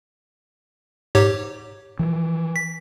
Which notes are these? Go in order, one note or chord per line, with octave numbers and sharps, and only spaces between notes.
G#2 G4 C#5
E3 F3
B6